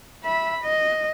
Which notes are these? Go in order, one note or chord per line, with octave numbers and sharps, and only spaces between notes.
E5 B5
D#5